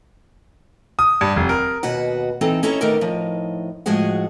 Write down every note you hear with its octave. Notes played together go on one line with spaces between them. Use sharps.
D#6
G2
F1
A#4
D#2 B2 F#4 B4 F#5
E3 C4 D#4 A4
C#4 E4 A4 C#5 D#5 A#5
D#3 A3 B3 D#4 A#4 D5
A2 F3 D#4
A2 F3 G#3 F#4 G#4 F#5